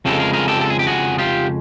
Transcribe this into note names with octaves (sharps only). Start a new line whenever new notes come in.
F2 C#3 F3 G#3 G4 A4
G#4 A#4
G#4 A#4
G4 A4
A4
G#4
G4
F#4 G#4
F4 G4